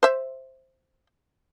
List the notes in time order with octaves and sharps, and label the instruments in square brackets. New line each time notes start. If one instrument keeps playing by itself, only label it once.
[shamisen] C5 E5